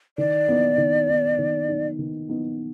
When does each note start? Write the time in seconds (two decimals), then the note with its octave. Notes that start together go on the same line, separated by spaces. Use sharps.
0.18 D#3 D5
0.48 B3 D#4
0.78 D#3
1.09 B3 D#4
1.38 D#3
1.69 B3 D#4
1.99 D#3
2.29 B3 D#4